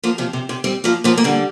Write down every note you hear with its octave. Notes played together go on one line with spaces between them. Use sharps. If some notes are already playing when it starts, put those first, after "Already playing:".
F3 A#3
C3 F3
C3
C3
G3 C4
F3 A#3
F3 A#3
A#3
D3 G3